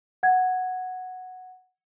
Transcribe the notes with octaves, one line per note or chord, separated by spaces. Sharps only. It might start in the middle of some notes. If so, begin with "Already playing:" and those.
F#5 G#6